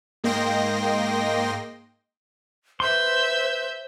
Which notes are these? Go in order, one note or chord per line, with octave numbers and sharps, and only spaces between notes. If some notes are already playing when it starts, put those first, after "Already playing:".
G#2 A#3 D#5 G5 C6 A#6
B4 C5 E5 C6 G6